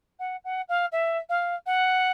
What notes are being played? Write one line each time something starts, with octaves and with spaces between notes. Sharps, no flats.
F#5
F#5
F5
E5
F5
F#5